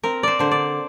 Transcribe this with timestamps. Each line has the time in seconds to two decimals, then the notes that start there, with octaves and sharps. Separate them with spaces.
0.03 C4 A#4
0.23 C5 D5
0.39 D3 C5
0.51 D5